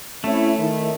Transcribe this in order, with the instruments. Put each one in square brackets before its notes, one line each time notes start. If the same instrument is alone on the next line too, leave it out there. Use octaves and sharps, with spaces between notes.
[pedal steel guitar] A3 [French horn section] C4 C#4 E4
[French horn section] D#3